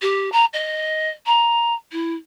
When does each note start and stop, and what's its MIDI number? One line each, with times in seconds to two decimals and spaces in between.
0.01 0.31 67
0.32 0.45 82
0.53 1.10 75
1.26 1.74 82
1.92 2.14 64